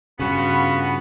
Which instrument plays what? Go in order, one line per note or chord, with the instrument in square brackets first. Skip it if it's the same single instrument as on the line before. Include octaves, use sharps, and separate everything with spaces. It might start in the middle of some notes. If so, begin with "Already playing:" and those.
[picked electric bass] G2 C#3 [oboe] B3 [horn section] C#4 F4 F#4 [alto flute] B5